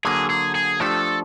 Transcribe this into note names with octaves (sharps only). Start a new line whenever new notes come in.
D3 F#3 A#3 G#4
G#4
G#4
F3 A3 D4 G4 A4